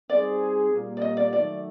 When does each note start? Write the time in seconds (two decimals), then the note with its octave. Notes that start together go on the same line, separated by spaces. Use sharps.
0.09 G3 C4 D#4 G#4 C5 D5
0.71 A#2 G3 A#3
0.97 D5
1.02 D#5
1.17 D5
1.32 D#3 F#3 A3 D5